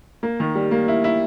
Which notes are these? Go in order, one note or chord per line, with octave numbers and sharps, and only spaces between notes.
A#3
D#3
G3
A#3
E4
E4